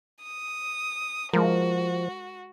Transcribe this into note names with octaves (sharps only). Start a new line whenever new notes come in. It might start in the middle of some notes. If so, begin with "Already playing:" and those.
D#6
F3 G#3 F#4 A#4